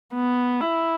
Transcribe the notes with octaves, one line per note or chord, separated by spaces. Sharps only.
B3
E4